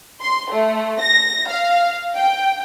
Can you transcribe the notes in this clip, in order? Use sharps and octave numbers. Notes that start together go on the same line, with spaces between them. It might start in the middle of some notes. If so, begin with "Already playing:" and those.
C6
A3
A#6
F5
G5